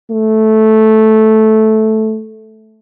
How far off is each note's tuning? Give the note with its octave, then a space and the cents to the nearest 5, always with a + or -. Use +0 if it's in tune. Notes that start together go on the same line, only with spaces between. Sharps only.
A3 -10